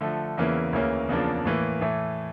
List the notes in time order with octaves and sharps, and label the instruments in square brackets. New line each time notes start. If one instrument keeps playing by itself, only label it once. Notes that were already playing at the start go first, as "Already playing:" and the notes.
[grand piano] D3 F3 A3
E2 C#3 E3 A#3 E4
D2 C#3 E3 A#3 C#4
E2 C#3 F3 A#3 D4
A2 E3 A#3
A2 E3 A3